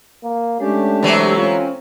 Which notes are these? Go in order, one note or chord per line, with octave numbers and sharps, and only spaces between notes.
A#3
G#3 A3 C#4 D4 G4 A4 C#5
C3 E3 F#3
C4 C#4 F4